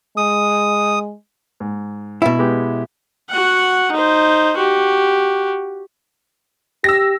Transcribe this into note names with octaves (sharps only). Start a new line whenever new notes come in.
G#3 D#6
G#2
B2 E4
G#3 B3 G4
F#4 F#5
D#4 C5
F#4 G4
G4 E6 A#6